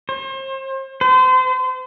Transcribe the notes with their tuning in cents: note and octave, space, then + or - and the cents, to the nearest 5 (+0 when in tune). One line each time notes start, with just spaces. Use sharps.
C5 +40
C5 -35